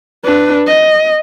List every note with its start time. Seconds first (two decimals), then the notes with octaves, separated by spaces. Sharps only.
0.24 D4 B4
0.67 D#5